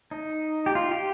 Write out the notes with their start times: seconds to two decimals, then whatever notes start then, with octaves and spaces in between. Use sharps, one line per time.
0.11 D#4
0.66 G4
0.75 F4
0.91 G4